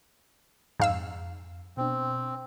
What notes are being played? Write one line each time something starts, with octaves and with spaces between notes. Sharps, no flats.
F2 G#2 F5 E6
B2 C4 D4